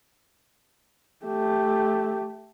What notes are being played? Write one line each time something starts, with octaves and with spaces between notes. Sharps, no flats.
A3 G4